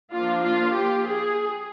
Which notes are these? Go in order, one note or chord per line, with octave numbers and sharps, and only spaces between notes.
F3 A#3 D4 F4
F4
G4
G#4